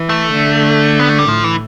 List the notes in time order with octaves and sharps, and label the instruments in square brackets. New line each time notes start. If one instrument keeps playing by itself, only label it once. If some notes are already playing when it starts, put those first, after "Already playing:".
Already playing: [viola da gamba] E3
[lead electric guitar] A3
[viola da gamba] D3
[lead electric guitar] B3
A3
G3
[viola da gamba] A2 [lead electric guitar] F3
[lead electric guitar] E3